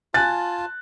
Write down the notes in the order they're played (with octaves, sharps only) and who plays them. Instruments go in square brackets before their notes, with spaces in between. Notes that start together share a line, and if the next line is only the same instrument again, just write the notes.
[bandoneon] F4 A5 [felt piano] G#5 F#6 A6